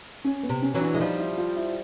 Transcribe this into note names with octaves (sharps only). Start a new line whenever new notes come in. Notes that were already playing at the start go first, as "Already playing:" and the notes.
C#4
B3
C3
C#4
E3 F#3
D4
G#3 E4
F3 G3 D#4
E4
F4
E4